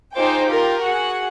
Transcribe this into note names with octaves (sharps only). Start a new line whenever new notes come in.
D#4 F4 G#4 C5 G5 D6
F4 G4 A#4 G5
F#4 G#4 F#5